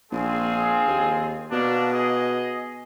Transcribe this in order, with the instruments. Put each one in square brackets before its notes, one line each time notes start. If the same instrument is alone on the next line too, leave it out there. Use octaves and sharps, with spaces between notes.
[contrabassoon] A#1 [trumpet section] C4 F4 G#4
[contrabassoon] D#2
[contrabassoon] B2 [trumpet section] A#3 D4
[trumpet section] G#4 D#5